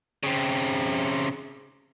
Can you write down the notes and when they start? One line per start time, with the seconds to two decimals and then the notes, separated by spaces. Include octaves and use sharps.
0.23 C#3 C4